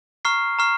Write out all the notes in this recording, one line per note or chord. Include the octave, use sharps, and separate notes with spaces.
A#5 C#6 F6 C7
A#5 C#6 F6 C7